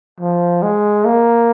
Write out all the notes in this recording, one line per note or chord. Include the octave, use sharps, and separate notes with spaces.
F3
G#3
A#3